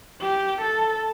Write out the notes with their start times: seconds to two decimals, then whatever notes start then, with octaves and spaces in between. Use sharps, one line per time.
0.21 G4
0.61 A4